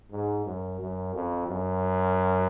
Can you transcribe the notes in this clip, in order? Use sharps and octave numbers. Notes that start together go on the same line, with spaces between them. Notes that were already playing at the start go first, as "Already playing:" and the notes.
G#2
F#2
F#2
F2
F#2